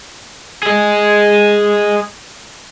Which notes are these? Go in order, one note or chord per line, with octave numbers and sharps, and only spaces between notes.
G#4 D#5